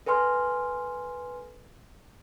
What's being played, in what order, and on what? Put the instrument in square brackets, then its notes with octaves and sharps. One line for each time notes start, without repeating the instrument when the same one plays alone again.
[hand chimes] A4 B4 G#5 C6 F6